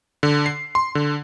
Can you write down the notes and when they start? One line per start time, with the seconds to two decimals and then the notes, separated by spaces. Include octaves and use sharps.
0.23 D3
0.46 C7
0.75 C6
0.95 D3